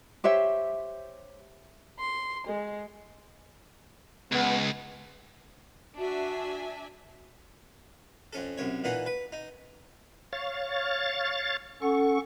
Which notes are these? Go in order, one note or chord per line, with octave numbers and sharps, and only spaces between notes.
G4 C5 C#5 E5
C6
G#3
C#2 B3
D4 F#4 E5 G#5
F2 C#4 A4
C2 F#2 C#5
A#2 E3 D#4 F#5
B4
D#4
C#5 F5 A6
C#4 A4 F#5 C#6